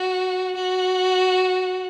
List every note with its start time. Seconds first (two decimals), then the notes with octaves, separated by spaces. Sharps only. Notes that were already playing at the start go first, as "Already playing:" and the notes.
Already playing: F#4
0.56 F#4